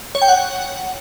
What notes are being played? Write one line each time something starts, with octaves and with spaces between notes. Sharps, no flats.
C#5
G5
F#5